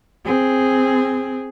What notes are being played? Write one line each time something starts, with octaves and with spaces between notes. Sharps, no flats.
C4 G#4